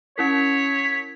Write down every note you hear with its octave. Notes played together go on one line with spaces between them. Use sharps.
C#4 E4 A#4 C#5 B6